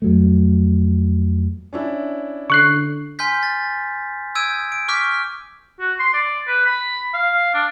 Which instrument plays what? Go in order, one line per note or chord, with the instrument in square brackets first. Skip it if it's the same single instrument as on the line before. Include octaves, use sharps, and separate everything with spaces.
[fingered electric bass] F2 F#3 A3
[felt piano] C#4 D4 E4
[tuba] D3 [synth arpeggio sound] C#6 F#6 C7
[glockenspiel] G#5 C6 F6 G6 B6
A6
D#6 E6 G6 G#6 D7 D#7
D7
C#6 D6 F6 G6 B6 D7
[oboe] F#4
C6
D5
B4
B5
F5
D4